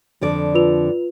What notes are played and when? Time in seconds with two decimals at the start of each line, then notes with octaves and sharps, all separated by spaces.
0.21 F2 D3 D5
0.55 F4 B4 F7